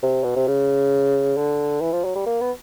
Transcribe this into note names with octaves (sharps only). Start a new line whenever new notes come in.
C3
B2
C3
C#3
D3
E3
F3
F#3
G3
A#3
B3